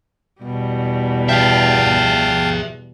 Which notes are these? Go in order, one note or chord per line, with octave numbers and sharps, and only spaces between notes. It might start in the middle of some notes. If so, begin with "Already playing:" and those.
E2 B2 G3
G#4 E5 F5 G5 A5